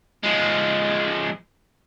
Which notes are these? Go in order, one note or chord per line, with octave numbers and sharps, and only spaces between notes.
F3 G#3